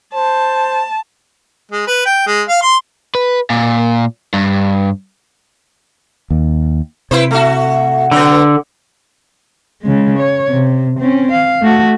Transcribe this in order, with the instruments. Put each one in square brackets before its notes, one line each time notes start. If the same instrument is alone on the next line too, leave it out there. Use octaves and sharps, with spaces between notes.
[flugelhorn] C5 [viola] A5
[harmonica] G#3
B4
G5
G#3
F5
C6
[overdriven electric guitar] B4
A#2
G2
[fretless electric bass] D#2
[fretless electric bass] C3 [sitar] E4 B4 C5
[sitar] A3 F#4
[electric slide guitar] D3 [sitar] F#3 B3
[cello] C#3 G#3
C#5
C3
C4 C#4
F5
A3 F#4